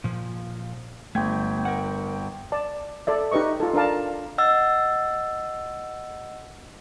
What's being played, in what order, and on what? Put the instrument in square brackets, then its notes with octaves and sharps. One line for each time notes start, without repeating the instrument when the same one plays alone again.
[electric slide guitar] A#2 F3
[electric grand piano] G1 G5 G#6 [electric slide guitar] A3
[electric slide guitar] A#4 F#5
[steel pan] D5 A5
A4 D5 E5
D#4 G4 B4 D#5 C#6
F4 A4
D4 A#4 D5 F5 A5
[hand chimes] D#5 F#5 E6 A6